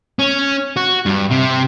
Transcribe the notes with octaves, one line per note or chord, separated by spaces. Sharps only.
C#4
F#4
G2
C3